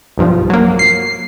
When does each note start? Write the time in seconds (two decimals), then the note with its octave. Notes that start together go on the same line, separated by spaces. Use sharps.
0.18 B1 G2 F3
0.50 F#3 A#3
0.79 C7